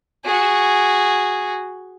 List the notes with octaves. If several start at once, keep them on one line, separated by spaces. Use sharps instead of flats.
F#4 G#4